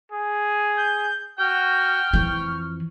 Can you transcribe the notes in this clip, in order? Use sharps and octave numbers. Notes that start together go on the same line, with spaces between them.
G#4
G6
F#4 G5 F6
F2 E3 C#6